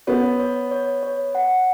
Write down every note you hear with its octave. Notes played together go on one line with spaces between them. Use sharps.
B3 C#5
C#5
C#5
C#5
F#5